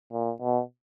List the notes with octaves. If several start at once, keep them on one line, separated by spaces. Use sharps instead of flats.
A#2
B2